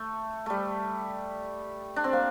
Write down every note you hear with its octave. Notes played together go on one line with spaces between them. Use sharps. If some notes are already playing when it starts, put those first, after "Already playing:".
Already playing: A3
G3 A3
D4
C4
A#3